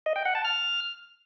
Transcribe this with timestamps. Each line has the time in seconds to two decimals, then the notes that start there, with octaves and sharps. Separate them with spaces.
0.06 D#5
0.16 G5
0.25 F#5
0.35 A5
0.45 F6